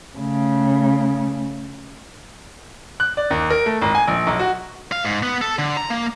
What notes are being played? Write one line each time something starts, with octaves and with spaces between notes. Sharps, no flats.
C#3 A3
F#6
D5
D#2
A#4
A3
G#1
G#5
A#1
B1
F#4
F5
G#2
B3
A4
D3
A#5
A#3